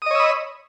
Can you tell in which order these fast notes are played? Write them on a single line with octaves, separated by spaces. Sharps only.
D#6 D#5 C#5 E6 B5